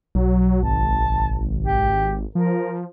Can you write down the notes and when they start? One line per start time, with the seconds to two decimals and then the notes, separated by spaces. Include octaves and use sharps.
0.15 B1 F#3
0.63 G#1 A5
1.65 G4
2.35 F3 A#4